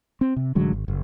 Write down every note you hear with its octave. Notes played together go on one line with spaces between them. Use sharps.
C4
C3
A1 D3 F#3 G#3
G#1
F#1